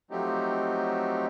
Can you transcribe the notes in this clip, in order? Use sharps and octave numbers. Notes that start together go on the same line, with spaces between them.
F3 F#3 A3 C4 D#4 G4